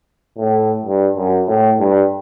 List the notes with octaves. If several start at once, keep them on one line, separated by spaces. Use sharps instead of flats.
A2
G2
F#2
A2
G2